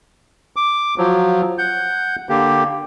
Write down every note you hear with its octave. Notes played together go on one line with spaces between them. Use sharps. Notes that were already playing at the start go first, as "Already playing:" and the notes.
D6
F3 F#3
F#5 G6
D3 A#3 G4